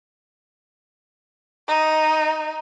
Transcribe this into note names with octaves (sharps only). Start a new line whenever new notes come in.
D#4